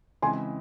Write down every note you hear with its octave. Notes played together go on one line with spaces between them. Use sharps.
C#3 E3 G#3 C4 G#5 C6